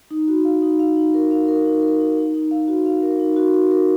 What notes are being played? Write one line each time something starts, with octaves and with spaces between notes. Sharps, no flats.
D#4
F#4
F5
D#4
F5
D#4
A#4
F5
A#4
D#4
A#4
D#4
D#4
D#4
F5
F#4
F5
A#4
D#4
F#4
F#4
A#4